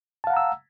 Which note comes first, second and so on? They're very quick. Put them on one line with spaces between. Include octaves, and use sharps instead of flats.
A5 F5 F#5 A#5 E6